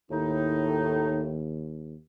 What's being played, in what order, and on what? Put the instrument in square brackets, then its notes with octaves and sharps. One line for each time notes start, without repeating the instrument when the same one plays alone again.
[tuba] D#2 [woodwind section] A2 D#4